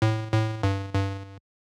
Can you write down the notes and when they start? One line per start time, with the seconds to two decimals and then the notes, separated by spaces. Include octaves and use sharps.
0.02 A2
0.33 A2
0.63 G2
0.94 G2